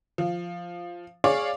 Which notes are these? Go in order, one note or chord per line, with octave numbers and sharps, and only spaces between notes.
F3
G#4 C#5 D5 F5 D6